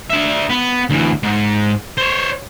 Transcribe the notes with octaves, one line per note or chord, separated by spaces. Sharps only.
D4 E5
B3
D2 E3
G#2
C5 C#5